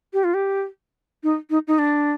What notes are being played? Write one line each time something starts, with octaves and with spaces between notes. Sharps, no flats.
G4
F4
G4
D#4
D#4
D#4
D4